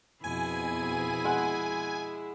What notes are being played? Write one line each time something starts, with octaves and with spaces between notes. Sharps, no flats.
F2 B2 E4 G#4 G#5
G#3 F#5